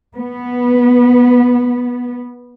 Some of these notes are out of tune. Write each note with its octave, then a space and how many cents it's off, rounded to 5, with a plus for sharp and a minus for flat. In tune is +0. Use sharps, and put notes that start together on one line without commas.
B3 -10